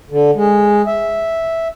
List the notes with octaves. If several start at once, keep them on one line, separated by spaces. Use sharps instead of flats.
D3
G#3
E5